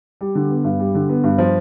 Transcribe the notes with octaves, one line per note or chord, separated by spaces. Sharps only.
G3
D3
B3
G2
G3
D3
B3
G2
F3